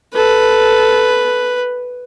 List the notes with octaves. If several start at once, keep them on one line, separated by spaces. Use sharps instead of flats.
A4 B4